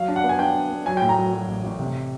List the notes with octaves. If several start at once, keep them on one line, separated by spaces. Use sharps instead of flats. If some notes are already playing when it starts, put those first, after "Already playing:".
Already playing: F#3 F5
D4
F#5
B3
G#5
D4 G5
D4
B3
F#3 G#5
G5
A2
A#5
F#3
F#3
A1
A1
C3